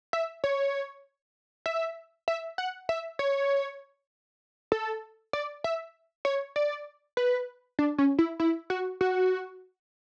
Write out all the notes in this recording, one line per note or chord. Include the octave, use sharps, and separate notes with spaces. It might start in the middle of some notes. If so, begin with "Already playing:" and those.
E5
C#5
E5
E5
F#5
E5
C#5
A4
D5
E5
C#5
D5
B4
D4
C#4
E4
E4
F#4
F#4